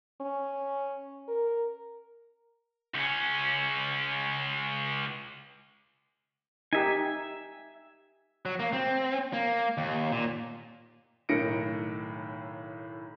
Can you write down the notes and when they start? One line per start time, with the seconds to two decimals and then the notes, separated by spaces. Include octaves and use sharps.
0.21 C#4
1.28 A#4
2.94 C#2 C#4
6.73 D#4 G4 E5 G#5
8.45 F#3
8.59 A#3
8.73 C4
9.33 A#3
9.78 D#2
10.12 A#2
11.29 B1 A2 D#3 A#6 C#7 D7